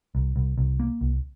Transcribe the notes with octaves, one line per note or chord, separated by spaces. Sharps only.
C2
C2
C2
A#3
C2